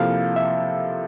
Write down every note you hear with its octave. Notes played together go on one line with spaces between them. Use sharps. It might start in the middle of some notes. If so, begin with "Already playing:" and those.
Already playing: C3 F3 A#3 E4 A4 F5
E5